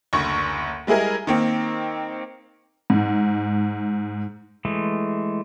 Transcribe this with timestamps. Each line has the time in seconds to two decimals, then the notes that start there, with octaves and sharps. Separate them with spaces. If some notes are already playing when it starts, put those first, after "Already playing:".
0.13 F#1 D2 C#6
0.87 G3 G#3 E4 G#4 A#4
1.27 D#3 A#3 C4
2.90 G#2
4.65 E3 G#3 A3